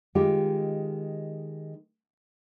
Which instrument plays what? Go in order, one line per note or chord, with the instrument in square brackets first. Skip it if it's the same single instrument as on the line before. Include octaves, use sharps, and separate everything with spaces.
[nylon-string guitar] D#3 G#3 F4 G4